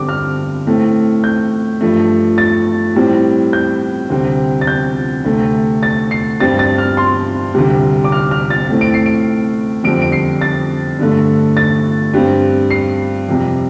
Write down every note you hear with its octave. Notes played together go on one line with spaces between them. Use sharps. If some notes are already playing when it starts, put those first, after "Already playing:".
Already playing: G2 D3 G3 C4 D6
F6
A2 A3 C4
G6
G2 F3 A3
A6
A2 G3 C4
G6
D2 C3 G3 C4
A6
G6
D2 C3 A3
A6
C7
G2 G3 C4 A6
A6
F6
C6
D2 C3 G3
D6
F6
F6
A6
A2 A3 C4
D7
C7
D7
F2 D3 G3 C4 D7
D7
C7
A6
G2 D3 A3
A6
G2 G3 C4
C7
F2 C3 G3